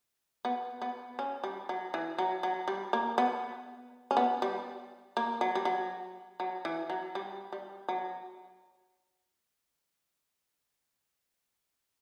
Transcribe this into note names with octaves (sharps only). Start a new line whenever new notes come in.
B3
B3
C#4
G3
F#3
E3
F#3
F#3
G3
A#3
B3
C#4
B3
G3
A#3
F#3
G3
F#3
F#3
E3
F#3
G3
G3
F#3